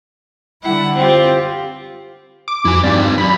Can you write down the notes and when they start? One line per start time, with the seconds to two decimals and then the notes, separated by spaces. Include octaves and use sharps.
0.63 D3 G3 E4 F#5
0.95 C4 F4 G4
2.48 D6
2.65 F2 E4 F#4 G#5
2.83 G2 C4 D#4 D5 F5 G#5
3.18 F#2 B5